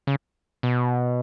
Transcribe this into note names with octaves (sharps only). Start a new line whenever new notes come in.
C#3
B2